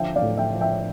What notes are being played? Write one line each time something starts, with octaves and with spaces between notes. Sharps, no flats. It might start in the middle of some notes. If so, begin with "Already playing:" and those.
Already playing: D3 F3 E5 G5
D5 F5
A2
E5 G5
F3
E5 G5